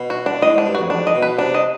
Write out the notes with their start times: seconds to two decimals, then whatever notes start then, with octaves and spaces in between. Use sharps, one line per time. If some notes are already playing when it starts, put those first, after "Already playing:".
Already playing: B2
0.10 F#4
0.26 D4
0.42 A2 D#5
0.55 G#2 D4
0.66 G2
0.75 F2 F#4
0.90 F2 D4
1.07 D#5
1.15 B2
1.22 B4
1.38 C3 D4
1.54 D#5